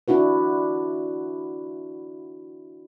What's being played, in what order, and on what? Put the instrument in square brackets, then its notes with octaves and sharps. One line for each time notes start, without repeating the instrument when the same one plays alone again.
[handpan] D4 E4 F#4 B4